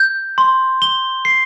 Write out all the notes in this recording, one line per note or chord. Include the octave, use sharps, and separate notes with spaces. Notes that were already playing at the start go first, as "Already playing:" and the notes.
Already playing: G6
C6
G7
C7